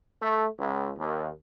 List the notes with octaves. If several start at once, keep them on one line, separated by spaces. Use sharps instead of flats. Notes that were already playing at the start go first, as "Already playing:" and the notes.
A3
C#2
D#2